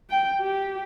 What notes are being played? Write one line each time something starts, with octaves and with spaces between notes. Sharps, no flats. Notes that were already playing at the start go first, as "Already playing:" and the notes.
G5
G4